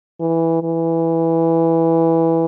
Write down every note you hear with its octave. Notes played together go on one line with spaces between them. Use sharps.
E3
E3